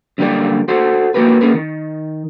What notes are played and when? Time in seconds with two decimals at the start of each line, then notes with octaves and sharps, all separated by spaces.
0.18 F#2 D3 G3 A#3 G4 D5
0.68 F#4 A4 C5
1.14 A#3 F#4 G4 A#4 B4
1.41 A#3 C#4 G#4 A#4 B4
1.54 D#3